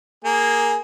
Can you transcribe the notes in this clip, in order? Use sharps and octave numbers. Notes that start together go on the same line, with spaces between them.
A#3 G#4